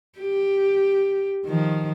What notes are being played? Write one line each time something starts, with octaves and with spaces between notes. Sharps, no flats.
G4
D#3 F3